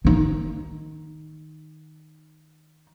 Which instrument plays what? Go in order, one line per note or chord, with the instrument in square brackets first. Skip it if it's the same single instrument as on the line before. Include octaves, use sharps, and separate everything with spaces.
[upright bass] D#3 D#4